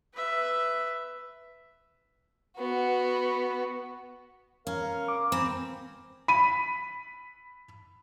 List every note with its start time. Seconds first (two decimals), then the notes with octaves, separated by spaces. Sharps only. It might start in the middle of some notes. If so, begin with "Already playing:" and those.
0.14 B4 E5
2.58 B3 F#4
4.67 C#4 A#4 F5
5.08 D6
5.32 C4 G#5 A#5 B5
6.28 B5 D#7